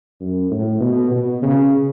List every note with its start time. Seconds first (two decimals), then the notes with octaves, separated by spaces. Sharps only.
0.21 F#2
0.51 A2
0.80 B2
1.11 B2
1.42 C#3